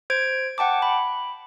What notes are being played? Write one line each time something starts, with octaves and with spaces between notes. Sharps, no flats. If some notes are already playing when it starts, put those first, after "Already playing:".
C5 G#6 D7
F#5 G5 A5 D6
B5